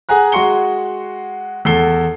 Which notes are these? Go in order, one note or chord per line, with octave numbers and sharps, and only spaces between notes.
G#4 F#5 G#5 A#5 F#6
G#3 F#4 C6 C#6 C#7 G7
E2 A4 C7 G7